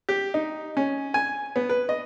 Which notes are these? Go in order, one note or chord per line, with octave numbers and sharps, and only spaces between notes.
G4
D#4
C#4
G#5
B3
B4
D#5